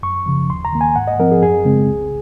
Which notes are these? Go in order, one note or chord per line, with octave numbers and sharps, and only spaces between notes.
F#2 C#6
C#3 F3
D#2 C6
A#5
D#3 A#3
G#5
G#2 F#5
D#5
F3 C4 A#4
G#4
F#2 G#4
C#3 G#3 C4
C2